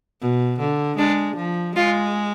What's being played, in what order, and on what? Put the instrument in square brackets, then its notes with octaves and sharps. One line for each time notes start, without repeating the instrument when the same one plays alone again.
[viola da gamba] B2
D3
[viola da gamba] G#3 [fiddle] D4
[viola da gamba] F3
[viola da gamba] G#3 [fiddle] F4